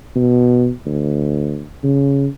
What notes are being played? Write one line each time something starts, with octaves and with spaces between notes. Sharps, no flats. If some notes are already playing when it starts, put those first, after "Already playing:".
B2
D2
C#3